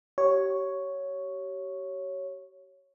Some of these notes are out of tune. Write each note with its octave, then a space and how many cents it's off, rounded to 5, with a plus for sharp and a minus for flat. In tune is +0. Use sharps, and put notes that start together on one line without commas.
G4 -35 C#5 +0